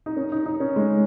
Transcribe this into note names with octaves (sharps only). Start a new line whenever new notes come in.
D#4
C#4
D#4
D#4
C#4
G#3